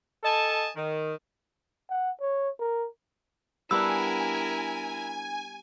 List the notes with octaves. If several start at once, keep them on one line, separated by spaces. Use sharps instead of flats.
A4 D#5 G#5 A5
D#3
F#5
C#5
A#4
G3 B3 D4 E4 A#4 G#5 E6